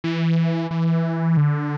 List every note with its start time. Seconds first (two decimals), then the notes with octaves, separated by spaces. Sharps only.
0.04 E3
0.71 E3
1.37 D3